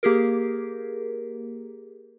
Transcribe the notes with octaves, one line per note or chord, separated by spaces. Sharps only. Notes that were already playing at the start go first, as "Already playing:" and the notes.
A#3 G4 G#4 A#4